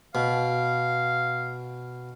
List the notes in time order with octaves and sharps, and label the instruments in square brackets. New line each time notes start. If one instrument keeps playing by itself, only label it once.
[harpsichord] B2 [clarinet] F5